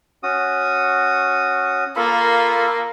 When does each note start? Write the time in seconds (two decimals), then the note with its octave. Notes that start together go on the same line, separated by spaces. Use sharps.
0.23 C#4 F#4 D#6
1.96 A#3 F4 A4 B5